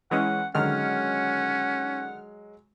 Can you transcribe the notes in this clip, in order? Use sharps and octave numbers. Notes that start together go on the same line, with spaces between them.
E3 G#3 C#4 F#5
D3 D#3 F#3 G#3 C#4 F#5 F6